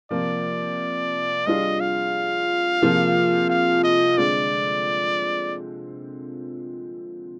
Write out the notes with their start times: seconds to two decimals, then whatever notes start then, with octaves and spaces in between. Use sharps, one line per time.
0.11 C3 F3 A#3 D5
1.47 G3 D4 F4 G#4 D#5
1.80 F5
2.82 C3 F3 A#3 F4 G#4
3.49 F5
3.84 D#5
4.18 D3 G#3 C4 D5